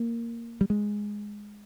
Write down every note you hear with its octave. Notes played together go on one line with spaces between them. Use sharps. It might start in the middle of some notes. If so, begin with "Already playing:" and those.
Already playing: A#3
G3
G#3